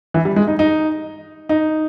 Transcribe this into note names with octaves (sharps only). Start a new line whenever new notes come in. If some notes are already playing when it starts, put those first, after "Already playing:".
E3
G3
G#3
D#4
D#4
D#4